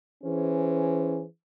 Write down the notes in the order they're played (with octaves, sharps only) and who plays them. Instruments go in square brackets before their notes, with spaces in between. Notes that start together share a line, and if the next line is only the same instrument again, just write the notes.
[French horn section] E3 C#4 G#4 C5